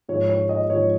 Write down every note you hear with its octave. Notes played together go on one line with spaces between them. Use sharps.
G#2 F3 C#5
C#5
D#5
G#2 F3 C#5